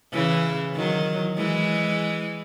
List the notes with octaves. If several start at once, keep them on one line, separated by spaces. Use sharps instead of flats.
C#3 E3
D#3 F#3
E3 G#3